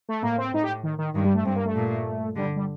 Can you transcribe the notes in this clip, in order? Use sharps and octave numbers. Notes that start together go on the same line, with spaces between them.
A3
A2 A#3
C4
A2 D#4
G4
D#3
D#3
G2 D#3
G3
A3
G2 C4
A#3
A3
A#2
D3 G3
G3